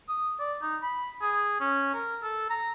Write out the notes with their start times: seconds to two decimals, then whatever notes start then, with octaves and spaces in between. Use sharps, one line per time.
0.08 D#6
0.39 D5
0.62 D#4
0.82 B5
1.21 G#4
1.60 C#4
1.94 A#4
2.23 A4
2.50 A#5